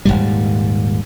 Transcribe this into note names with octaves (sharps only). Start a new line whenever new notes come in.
D#1 G#1 G#2 G3